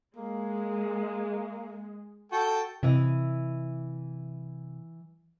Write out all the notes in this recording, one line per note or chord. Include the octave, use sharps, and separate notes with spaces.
G#3 A#3
F#4 A4 G5 A5
C3 E3 E4 D#5